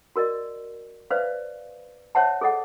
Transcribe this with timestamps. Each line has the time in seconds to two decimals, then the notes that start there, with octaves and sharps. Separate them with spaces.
0.16 F#4 A#4 D5 D#5
1.10 B4 C5 D5 E5 F5
2.15 C5 C#5 E5 F#5 A5
2.41 G#4 A4 D#5 F#5